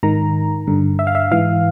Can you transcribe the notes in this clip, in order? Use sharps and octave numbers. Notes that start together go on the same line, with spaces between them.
G#2 D#3 A#5
G2 D3
E5
F5
E5
G#2 E3 F5